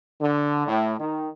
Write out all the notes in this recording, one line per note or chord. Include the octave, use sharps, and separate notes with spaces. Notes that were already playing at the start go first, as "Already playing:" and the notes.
D3
A2
D#3